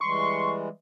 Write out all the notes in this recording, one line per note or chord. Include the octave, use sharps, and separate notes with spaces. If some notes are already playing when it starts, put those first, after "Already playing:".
E3 G3 G#3 C6 C#6